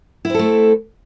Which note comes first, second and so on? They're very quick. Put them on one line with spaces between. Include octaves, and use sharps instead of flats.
E4 C4 A4 A3